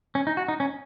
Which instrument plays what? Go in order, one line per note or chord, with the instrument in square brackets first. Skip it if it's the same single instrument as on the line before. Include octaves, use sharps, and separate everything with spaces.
[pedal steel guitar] C#4
D#4
F#4
D#4
C#4